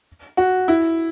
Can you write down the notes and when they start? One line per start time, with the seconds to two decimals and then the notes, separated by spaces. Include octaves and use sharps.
0.37 F#4
0.68 E4